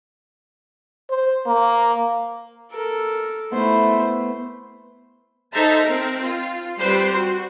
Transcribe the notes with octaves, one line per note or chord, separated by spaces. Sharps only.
C5
A#3
A4 A#4
A3 B3 E4 C5
D#4 A4 C5 E5 A5 A#5
C4 A#4
F4
G3 C4 B4 C5 C6
F#4